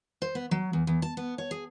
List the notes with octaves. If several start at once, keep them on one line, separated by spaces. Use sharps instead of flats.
C5
B3
F#3
E2
E2
A5
B3
C#5
G#4